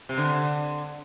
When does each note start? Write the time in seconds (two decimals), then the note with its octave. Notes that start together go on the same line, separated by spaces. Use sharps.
0.09 C3
0.18 D3